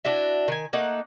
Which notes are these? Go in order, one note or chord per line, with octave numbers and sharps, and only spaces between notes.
D4 E4 F#4 E5
D#3 G#5
A3 A#3 D#4 F#5